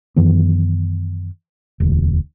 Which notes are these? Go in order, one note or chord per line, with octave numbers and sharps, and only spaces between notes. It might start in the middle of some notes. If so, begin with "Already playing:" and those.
F#2 D#3 E3 B3
E1 D2